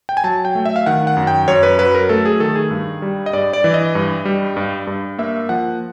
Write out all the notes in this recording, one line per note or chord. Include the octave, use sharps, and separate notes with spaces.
G5
G#5
F#3 A5
G5
A3
E5
F5
D#3 F#5
F#5
F#2
G5
F#2 C#5
B4
F#3 B4
A#4
A3 A4
G#4
D#3 A4
G#4
G2
G3
D#5
G2 D5
D5
E3
D#5
G2
G3
G2
G2
A#3 E5
F3 F#5